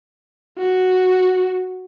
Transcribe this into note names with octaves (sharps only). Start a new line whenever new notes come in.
F#4